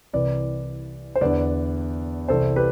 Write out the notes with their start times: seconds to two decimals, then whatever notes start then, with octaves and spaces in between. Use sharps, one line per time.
0.13 C2 C3 E3 B4 D5
1.15 C5
1.21 E2 D3 B4 D5
2.28 C2 C3 E3 A4 C5
2.56 G4 B4